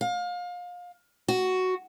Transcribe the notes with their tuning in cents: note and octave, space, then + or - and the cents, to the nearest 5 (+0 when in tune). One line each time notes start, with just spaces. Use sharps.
F5 +30
F#4 +5